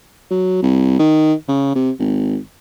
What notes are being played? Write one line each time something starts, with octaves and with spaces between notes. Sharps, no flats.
F#3
C2
D#3
C#3
C3
G#1